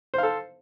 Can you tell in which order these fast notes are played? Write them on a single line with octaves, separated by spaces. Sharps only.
C5 F5 A4